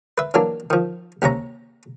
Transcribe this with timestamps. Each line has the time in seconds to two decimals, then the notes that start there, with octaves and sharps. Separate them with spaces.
0.18 B4 E5
0.34 E3 F#3 A#3 D4
0.70 D#3 F3
1.22 D#2 C3 C#4 A#5